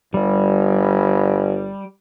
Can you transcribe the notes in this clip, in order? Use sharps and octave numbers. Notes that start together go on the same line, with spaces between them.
G1 G3